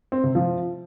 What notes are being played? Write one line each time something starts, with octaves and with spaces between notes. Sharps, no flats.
C4
C3
F3